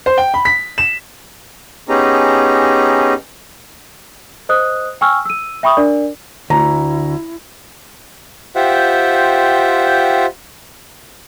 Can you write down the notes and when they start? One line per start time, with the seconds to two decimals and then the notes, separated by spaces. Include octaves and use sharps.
0.06 C5
0.18 G5
0.34 B5
0.45 B6
0.78 E7
1.89 B3 C#4 D#4 G4 G#4 A#5
4.49 C5 D#5 D#6 F#6
5.01 G5 G#5 C#6 E6 F6
5.25 E6 D#7
5.63 E5 G5 B5 C#6 D#6
5.77 D4 A#4 D5
6.50 D2 E4 A#5
8.56 F4 G4 C5 E5 F#5 G5